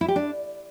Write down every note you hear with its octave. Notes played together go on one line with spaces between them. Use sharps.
E4
G4
D4